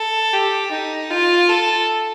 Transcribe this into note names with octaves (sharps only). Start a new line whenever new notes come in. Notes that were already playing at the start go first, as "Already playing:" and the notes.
Already playing: A4
G4
D#4
F4
A4